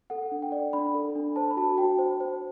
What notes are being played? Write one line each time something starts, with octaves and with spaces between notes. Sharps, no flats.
A4 F#5
D4
G5
D5
D4 B5
A4
D4
C5 A5
B5
F#4 A5
F#4 G5
C5
C5